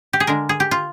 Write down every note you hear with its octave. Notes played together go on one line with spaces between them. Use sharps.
G4
G#4
D3 G#3 D4 A#4
G#4
G4
F4